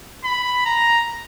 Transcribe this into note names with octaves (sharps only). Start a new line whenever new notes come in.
B5
A#5